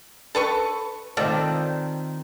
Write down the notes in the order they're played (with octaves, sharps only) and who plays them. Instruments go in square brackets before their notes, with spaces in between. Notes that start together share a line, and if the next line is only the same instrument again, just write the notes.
[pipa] A4 B4 C#6
[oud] D#3 C4 D#4 [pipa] F4 A4 D5